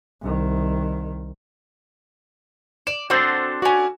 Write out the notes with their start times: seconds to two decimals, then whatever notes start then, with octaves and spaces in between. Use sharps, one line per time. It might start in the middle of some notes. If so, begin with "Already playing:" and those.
0.22 C2 D#3
2.87 D5 E7
3.10 C4 D4 F#4 A4 C5
3.62 C#4 F#4 D5 G#5